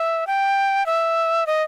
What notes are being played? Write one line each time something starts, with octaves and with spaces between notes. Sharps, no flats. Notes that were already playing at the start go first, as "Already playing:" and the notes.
Already playing: E5
G5
E5
D#5